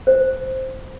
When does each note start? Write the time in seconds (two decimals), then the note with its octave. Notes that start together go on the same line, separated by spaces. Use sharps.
0.07 C5